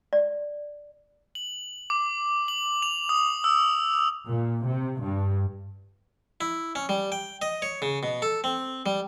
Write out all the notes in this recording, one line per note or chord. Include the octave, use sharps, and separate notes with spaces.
D5
F#7
D6
F#7
F7
D#6
E6
A#2
C3
G2
E4
C#4
G3
G5
D#5
C#5
C#3
B2
A4
C4
G3